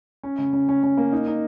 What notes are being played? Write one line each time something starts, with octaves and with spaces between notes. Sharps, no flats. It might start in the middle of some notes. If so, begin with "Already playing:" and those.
C#4
C#3
C#4
C#4
C#4
A#3
D#4
D#4